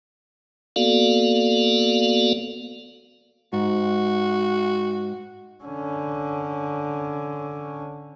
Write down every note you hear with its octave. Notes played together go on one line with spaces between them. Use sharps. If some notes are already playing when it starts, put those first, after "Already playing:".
A#3 B3 F#4 A4 D5 F5
G#2 F#4
D3 C#4